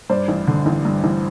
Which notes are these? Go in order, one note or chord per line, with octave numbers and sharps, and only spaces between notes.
G2 C5 D5
A1
D3
A1
G2
A1